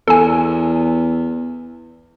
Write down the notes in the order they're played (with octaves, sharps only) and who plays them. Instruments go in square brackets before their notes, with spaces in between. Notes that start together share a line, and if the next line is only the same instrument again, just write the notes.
[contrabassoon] E2 [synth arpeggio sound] A4 G#5